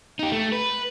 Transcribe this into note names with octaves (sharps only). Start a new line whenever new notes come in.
D#4 G4
A3
B4